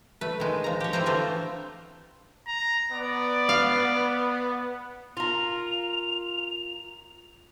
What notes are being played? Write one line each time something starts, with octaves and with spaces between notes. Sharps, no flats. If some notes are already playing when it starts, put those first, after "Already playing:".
A3 B4
D#3 G#3
F3 A#5
G4 C#5
C4 E4 A4 B4 C5 A#5
D3 E3 A3 C4 F4 C5
A#5
B3 D5
F5
F4 A#4 F7